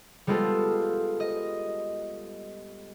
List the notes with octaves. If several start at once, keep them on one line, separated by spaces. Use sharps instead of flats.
G3 G#3 B3 F4 A4
D#5